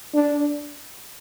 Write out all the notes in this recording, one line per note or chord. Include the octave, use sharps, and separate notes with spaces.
D4